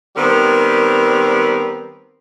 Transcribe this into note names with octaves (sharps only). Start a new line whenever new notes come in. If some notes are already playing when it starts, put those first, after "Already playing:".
D#3 G3 B3 C4 A#4